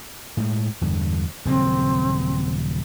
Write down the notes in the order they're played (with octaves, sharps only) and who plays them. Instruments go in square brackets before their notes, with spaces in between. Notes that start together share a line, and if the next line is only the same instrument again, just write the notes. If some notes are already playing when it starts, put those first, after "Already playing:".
[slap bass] A2 G#3
E2 G2 D3
[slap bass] D#1 C#3 F#3 [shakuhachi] C4